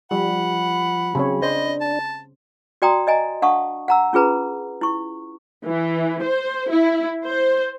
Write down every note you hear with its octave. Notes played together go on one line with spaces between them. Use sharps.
F3 G3 F#5 B5
C#3 F#3 C4 C#5
D4 C5 D#5
A5
F#4 D5 G5 A#5 C6 D#6
D5 D#5 G#5 A#5
D4 F5 F#5 A5 C#6 D#6
F#5 A#5 E6
C#4 F4 G#4 B4 A#5
E4 C#6
E3
C5
E4
C5